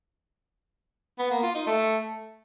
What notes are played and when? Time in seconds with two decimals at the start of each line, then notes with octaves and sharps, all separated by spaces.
1.19 B3
1.31 A#3
1.43 F4
1.55 D#4
1.67 A3